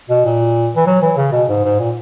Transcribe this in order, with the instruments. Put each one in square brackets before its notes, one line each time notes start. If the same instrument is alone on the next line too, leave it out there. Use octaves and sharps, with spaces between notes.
[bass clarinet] B2
A#2
E3
F#3
E3
C#3
B2
G#2
G#2
A#2